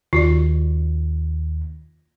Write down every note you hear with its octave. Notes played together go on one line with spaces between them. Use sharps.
D#2 F4 F#4 D5